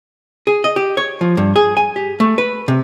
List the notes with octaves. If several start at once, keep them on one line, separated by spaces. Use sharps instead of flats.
G#4
D#5
G4
C#5
F3
G2
G#4
G#5
G4
A3
B4
C3